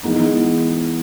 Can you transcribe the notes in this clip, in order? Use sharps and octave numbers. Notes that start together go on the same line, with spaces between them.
E3 G#3 B3 D#4